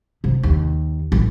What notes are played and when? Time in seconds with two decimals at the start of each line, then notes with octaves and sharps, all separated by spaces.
0.24 C3
0.43 D#2
1.12 A1